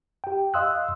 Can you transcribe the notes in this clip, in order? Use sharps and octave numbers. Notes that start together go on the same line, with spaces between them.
G4 G5
D#5 F5 C6 D#6 E6 F#6